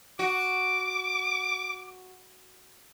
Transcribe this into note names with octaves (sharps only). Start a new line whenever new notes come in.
F#4 D6